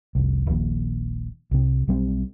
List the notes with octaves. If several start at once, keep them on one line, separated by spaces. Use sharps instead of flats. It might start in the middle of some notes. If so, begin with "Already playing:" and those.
F1 C2
D#1 A#1 D#2
C2 C3
B1 G3 C4